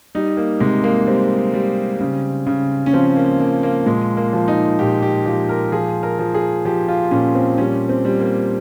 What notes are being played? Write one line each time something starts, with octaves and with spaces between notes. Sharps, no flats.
G3 D#4
A#3
C3 G#3
A#3
G3 C4
G3
C#3
C#3
C#4
F3 C4
A#3
F3 A#3
A#3
A#2 G#3
A#3
F3
D#4
A#2 G4
G4
F3 G4
A#4
F3 G#4
A#4
F3
G#4
F3 G4
F4
A#2 C#4
C4
G3 C#4
C4
G3
A#3